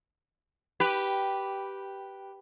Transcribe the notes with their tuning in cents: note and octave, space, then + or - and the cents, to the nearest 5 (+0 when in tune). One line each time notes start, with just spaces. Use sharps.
G4 -5 B4 -5